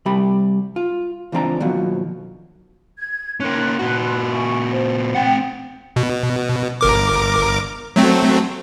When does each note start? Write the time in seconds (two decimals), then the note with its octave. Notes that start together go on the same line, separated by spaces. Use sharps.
0.06 C3 G3 G4 B5
0.76 F4
1.32 C#2 E3 F3 C4 D4 A#5
1.60 D#2 B2 F3 F#3
2.98 G#6
3.40 A#3 C#4 D#4 C6 F#6
3.79 A#2 F#4
4.31 E5 G#5 C#6
4.70 C5
5.15 C4 F#5 G5
5.96 B2
6.81 G1 A#4 D6
7.96 F#3 A3 C4